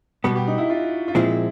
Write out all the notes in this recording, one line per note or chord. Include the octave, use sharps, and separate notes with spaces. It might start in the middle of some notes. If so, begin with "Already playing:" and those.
B2 G3 B3 F#4
G4
D#4
E4
F4
F4
A#2 F3 G#3 C4 E4